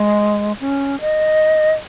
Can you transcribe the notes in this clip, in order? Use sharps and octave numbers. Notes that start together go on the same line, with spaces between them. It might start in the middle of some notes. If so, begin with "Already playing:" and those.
Already playing: G#3
C#4
D#5